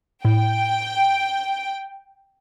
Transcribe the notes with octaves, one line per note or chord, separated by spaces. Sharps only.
A2 G5